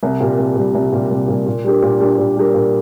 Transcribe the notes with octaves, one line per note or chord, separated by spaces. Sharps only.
C2
A#2 G3
C2
A#2 G3
C2
A#2 G3
C2
A#2 G3
A#2
G3 D4 G4 A#4
A#2
G3 D4 G4 A#4
A#2
G3 D4 G4 A#4
A#2